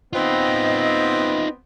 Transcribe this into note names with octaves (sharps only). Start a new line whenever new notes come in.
B3 C4 D#4 F4 D#5